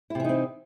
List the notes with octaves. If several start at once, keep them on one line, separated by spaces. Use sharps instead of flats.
C3 E3 C4 D#4 E4